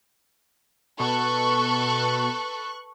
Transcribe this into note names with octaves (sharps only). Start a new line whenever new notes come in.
B2 A4 B4 C#6 F#6